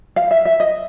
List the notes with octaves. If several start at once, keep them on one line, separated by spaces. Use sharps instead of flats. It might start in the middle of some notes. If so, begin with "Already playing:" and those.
F5
E5
E5
D#5